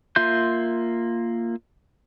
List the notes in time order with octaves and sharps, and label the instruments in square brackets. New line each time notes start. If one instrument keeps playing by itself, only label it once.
[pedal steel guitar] A#3 F4 E5 C6 G6